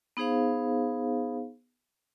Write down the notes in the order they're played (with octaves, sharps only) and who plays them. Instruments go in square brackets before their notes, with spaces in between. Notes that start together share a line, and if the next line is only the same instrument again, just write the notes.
[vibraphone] B3 D#4 G#4 C5 F5